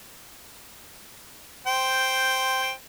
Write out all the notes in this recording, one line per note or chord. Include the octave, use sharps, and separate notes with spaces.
C5 G5